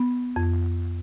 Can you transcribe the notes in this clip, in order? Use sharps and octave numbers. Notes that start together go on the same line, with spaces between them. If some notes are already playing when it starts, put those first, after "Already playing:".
Already playing: B3
F2